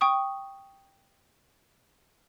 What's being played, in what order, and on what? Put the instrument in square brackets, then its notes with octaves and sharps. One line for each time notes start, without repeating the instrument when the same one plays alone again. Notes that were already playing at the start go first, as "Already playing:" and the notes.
[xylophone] G5 C#6 D#6